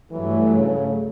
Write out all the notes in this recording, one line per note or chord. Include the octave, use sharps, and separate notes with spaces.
G2 E3 F#3 A3
C#3